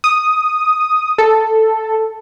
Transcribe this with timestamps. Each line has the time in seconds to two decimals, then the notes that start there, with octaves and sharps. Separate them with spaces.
0.04 D#6
1.18 A4